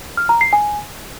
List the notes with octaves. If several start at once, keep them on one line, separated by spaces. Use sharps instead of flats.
F6
A#5
C7
G#5